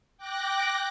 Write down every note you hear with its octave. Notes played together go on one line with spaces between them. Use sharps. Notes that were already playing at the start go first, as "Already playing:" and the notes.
G5 D6 F#6 A#6